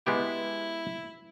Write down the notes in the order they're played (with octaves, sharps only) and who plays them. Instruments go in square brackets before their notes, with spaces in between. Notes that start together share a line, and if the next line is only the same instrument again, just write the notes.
[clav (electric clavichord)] G#3 B3 G4 [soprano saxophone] E4